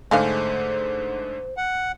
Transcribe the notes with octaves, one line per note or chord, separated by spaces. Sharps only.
G#2 D3 G#3 A3 D4 C5 F5
F#5